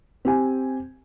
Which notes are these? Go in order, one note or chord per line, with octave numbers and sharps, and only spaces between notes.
C4 G4 G#5